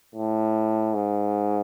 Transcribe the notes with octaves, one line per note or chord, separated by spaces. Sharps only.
A2
G#2